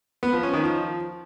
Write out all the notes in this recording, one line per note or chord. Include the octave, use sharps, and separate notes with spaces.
B3
F3
C#4
D#3
F3